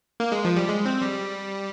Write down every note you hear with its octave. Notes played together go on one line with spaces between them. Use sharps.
A#3
G#3
F3
G3
G#3
C4
G3